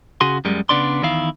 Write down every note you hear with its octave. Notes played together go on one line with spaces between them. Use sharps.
C#3 F#4 G#4 C6
F#2 G3 G#3
C#3 B3 D4 D5 C6
E2 D#3 E4 F5